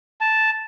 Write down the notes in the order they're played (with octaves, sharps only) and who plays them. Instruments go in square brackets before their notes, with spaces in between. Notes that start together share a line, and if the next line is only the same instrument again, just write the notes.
[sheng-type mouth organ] A5